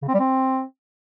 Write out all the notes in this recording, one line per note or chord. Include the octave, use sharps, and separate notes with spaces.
C#3
C4
G3
C4